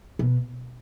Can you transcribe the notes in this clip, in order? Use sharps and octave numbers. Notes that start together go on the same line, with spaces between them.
B2